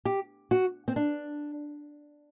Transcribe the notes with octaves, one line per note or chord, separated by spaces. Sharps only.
G4
F#4
C4
D4